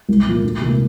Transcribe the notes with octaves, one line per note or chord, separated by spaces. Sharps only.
C2
A#2 F3 A#3
D2
C3 E3 A#3